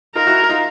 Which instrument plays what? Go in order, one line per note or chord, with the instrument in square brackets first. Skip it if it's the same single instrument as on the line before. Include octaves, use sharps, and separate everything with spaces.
[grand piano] D#4 F4 [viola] A#4
[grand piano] E4 F#4
D#4 F4